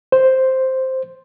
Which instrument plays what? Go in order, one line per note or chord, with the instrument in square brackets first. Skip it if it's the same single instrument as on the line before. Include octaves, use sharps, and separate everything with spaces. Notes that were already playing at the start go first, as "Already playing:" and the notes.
[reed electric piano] C5